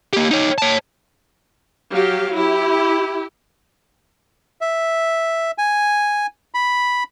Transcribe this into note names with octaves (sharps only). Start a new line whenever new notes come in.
A#3 G4
D#4 C#5
C#5 A5
F#3 G4 F5
E4 G4
E5
G#5
B5